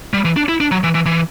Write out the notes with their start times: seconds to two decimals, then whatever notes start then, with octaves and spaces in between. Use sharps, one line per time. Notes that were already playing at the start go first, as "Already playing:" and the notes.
0.14 G3
0.25 E3
0.37 D4
0.49 E4
0.60 D4
0.71 F#3
0.84 E3
0.95 E3
1.06 E3